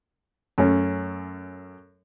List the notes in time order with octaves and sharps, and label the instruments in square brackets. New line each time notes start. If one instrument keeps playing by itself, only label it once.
[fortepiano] F#2 A3 C#4